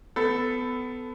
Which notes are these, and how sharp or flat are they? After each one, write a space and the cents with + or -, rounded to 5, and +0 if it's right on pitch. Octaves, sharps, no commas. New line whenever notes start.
B3 +20 A4 +0